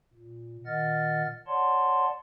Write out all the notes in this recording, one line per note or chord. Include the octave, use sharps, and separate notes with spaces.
A#2
A#2 D#3 D#5 F#5 F6 A6
C#5 D5 F#5 A5 C6